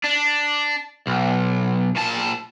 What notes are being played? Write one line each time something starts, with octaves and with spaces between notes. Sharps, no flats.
D4
B1
A#2 A5